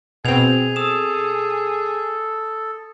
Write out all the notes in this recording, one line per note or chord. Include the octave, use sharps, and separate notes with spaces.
B2 C4 G#4 G#6 F7
A4 D#6 E7